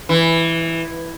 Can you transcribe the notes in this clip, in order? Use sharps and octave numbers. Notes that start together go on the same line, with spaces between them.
E3